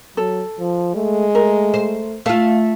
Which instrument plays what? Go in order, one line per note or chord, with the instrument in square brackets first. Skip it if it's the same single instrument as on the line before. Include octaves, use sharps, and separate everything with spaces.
[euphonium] F#3 [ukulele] A4
[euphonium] F3
[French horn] G#3 [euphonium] A3
[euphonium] A3 [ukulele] A#4
[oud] C5
[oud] A3 F4 [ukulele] F5